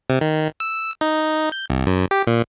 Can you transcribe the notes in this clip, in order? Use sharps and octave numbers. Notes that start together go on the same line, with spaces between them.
C3
D#3
E6
D#4
G6
C2
F#2
G4
A#2